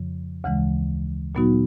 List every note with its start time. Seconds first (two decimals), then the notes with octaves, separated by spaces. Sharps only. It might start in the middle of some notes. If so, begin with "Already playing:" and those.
Already playing: F2 C#3 F3
0.44 D2 C#3 E3 G#3
1.35 A#2 F#3 B3 D#4 F#4